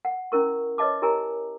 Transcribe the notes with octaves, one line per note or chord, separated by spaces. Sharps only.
F#5
C#4 E4 A#4 C#6
B4 C#5 D#5 E5 A5 D6
E4 G4 A#4 G#5 A#5